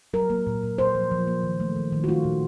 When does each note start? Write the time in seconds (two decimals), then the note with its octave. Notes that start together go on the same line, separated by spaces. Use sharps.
0.13 F#3 A#4
0.30 A#3
0.47 A#2
0.63 A#2
0.78 A#2 C5
0.95 F3
1.11 F3
1.27 A#3
1.43 D#3
1.60 A3
1.76 D#3
1.92 D#3
2.04 F#4
2.08 A3 F4
2.24 A#2